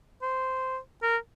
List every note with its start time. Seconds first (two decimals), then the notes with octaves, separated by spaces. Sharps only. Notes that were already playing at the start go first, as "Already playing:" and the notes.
0.22 C5
1.03 A#4